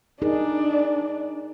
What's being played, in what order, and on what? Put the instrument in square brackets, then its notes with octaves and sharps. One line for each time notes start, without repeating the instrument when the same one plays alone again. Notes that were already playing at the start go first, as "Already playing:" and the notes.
[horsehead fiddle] D4 [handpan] D#4 G#4 A#4